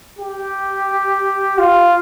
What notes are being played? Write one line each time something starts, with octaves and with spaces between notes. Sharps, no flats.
G4
F4